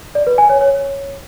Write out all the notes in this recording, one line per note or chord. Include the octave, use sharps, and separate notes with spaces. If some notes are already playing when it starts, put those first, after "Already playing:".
D5
B4
G#5
C#5
C#5